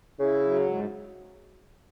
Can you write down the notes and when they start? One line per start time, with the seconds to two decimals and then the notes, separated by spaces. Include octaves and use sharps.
0.19 C#3 E4
0.43 F#3
0.65 G#2